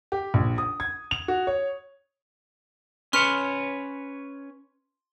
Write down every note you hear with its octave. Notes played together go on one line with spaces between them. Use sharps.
G4
A#1
D#6
G#6
F7
F#4
C#5
C#4 B4 C#5 C6 F6